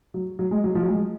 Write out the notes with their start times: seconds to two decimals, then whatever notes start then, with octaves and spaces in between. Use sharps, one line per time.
0.14 F#3
0.39 F#3
0.51 G#3
0.64 F#3
0.75 F3
0.82 F#3
0.88 G#3